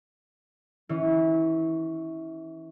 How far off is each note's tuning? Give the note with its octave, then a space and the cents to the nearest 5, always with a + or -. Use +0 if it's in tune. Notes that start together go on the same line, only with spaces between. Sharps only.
E3 -25 C#4 +0